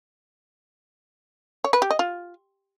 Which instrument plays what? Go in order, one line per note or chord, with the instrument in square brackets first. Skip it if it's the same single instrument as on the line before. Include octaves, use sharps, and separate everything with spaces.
[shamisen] C#5
B4
G4
D#5
F4